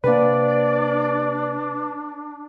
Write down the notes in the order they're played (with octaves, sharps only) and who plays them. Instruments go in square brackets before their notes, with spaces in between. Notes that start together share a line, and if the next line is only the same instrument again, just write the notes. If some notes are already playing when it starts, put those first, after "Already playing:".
[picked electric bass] C3 A#3 [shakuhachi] D4 [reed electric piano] B4 [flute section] D5